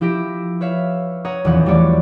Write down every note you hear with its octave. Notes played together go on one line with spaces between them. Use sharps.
F3 E4 G4 E5 A#6 D7
B4 C#5 E5 F5
C#5 F#5 A#5 D#6
D#1 E2 E3 F3 F#5
E3 G3 A3 F#4 C#5 D5